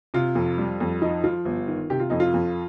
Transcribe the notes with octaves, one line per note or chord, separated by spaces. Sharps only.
C3 F4
F2
G3
F2
F3 D#4
F3 F4
G1
D#3
C3 G4
F4
F2 D#4
F4
F2